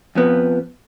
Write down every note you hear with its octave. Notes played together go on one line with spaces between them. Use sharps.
F2 F3 B3